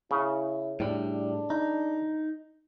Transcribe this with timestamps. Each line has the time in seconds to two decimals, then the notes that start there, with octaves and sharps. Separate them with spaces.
0.11 C#3 E4
0.80 A2 G3 D4
1.50 D#4